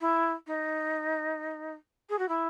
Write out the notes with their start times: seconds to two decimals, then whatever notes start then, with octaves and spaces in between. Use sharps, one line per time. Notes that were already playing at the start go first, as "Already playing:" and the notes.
0.01 E4
0.47 D#4
2.09 G#4
2.18 F#4
2.28 E4